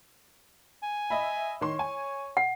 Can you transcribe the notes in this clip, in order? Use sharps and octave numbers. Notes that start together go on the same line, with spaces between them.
G#5
D#5 E5 B5
D#3 C#5 C6
G#5
F#5